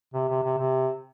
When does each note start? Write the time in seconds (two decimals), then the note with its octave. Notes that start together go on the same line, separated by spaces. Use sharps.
0.14 C3
0.28 C3
0.43 C3
0.58 C3